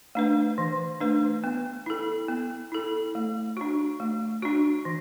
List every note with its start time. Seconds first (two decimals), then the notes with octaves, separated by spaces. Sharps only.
0.15 A3 D4 B4
0.58 E3
1.00 A3 D4 B4
1.44 B3
1.86 E4 A4
2.28 B3
2.72 E4 A4
3.15 A3
3.57 D4 F#4
4.00 A3
4.42 D4 F#4
4.85 E3